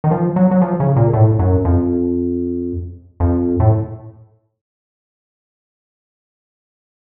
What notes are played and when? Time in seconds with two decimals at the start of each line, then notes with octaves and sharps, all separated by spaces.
0.04 D#3
0.11 F3
0.36 F#3
0.51 F#3
0.62 F3
0.80 C#3
0.97 A#2
1.13 A2
1.39 F#2
1.65 F2
3.20 F2
3.60 A2